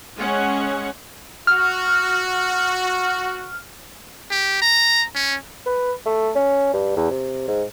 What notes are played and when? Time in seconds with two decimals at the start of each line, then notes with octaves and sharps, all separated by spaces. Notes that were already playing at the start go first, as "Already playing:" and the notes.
0.16 G#3 C#4 F#5
1.47 F#4 F6
4.31 G4
4.61 A#5
5.15 C#4
5.66 B4
6.06 A3
6.36 C#4
6.73 G2
6.97 E2
7.11 C3
7.48 G#2